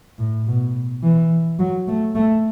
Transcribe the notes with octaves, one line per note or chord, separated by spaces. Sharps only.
A2
B2
E3
F#3
A3
A3